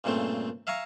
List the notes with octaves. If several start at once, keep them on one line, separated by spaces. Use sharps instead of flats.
G2 A#2 C#3 A3 C4
E5 F5 G#5 A#5 C#6